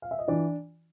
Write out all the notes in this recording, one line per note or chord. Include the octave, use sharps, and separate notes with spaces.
F5
E5
D#5
E3 D4 D5